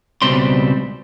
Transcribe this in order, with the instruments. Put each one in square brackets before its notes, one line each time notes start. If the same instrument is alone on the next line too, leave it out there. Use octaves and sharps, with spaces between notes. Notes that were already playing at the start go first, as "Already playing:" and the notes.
[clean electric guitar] C#2 B2 G3 C4 D5 C6